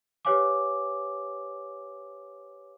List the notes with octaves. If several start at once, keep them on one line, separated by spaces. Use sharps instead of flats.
G4 B4 C#5 F5 G#5 D6